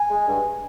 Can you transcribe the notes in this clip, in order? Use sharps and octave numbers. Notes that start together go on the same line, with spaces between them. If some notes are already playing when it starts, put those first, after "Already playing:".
Already playing: G#5
G#3
G2